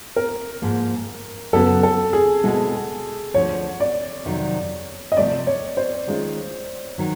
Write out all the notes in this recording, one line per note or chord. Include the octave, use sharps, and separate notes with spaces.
A#4
G#2 F3 A#3
F#2 C#3 F#3 B3 A4
A4
G#4
B2 G#3 C4 E4 A4
D2 D3 F3 C#5
D5
F2 C3 D#3 F#3
D#5
C3 F3 A3 C4 D5
C#5
C5
D#3 G#3 C#4 F4
D#3 F#3